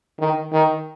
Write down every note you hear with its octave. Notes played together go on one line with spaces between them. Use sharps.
D#3
D#3